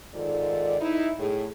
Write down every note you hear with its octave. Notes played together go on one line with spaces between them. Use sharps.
G#2 D#3 F4 A4 D5
D#4 E4
A2 G#4